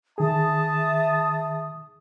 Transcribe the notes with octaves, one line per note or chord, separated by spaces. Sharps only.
D#3 G#4 E5 A5 D#6